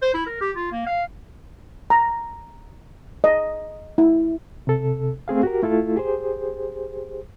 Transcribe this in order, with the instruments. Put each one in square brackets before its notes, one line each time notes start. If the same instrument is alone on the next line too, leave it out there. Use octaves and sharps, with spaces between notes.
[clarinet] C5
E4
A#4
G4
F4
A#3
F5
[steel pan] A#5
D#5
E4
[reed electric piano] C3 A4
A3 C4 G#4 F5
F#4 G4 A#4
A3 E4 F4 A4
G4 G#4 C5